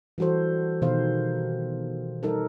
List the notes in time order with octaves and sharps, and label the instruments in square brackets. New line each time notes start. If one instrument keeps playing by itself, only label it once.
[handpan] E3 G3 F#4 A4 C5
B2 D#3 D#4 G4 C5 F5
G3 D#4 A4 A#4